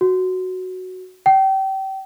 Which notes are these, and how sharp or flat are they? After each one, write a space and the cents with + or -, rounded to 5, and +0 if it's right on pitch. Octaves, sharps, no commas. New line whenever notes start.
F#4 +0
G5 -30